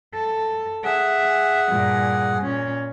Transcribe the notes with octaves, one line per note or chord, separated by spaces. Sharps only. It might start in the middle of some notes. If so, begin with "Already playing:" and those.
A4
G#4 E5 F#5
G2 A#2
A#2 C#4